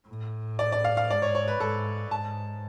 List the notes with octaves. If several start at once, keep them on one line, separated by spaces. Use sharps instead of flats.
A2
D5
D5
F5
F5
G#2 D5
C#5
C#5
B4
G#2 A4
G#2 A5